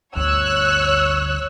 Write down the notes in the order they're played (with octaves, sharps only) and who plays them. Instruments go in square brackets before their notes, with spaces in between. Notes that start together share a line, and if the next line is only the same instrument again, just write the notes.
[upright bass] G1 D2 [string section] C#5 E6 F#6